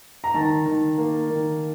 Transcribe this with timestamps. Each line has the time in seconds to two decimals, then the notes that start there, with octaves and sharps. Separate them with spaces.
0.24 A#5
0.34 D#3 A5
0.65 D#3
0.98 A#3
1.30 D#3